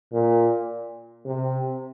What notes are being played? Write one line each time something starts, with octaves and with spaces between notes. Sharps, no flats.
A#2
C3